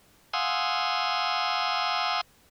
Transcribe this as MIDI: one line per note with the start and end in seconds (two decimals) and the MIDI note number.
0.33 2.21 77
0.33 2.21 78
0.33 2.21 80
0.33 2.21 84
0.33 2.21 87
0.33 2.21 88